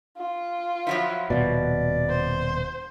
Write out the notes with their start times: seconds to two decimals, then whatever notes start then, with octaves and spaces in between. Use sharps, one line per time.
0.17 F4
0.87 F3 F#3 E4
1.30 D#1 B2 D5
2.09 C5